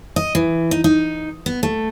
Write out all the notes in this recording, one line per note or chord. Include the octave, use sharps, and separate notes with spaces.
D#5
E3
D#4
D#4
B3
A3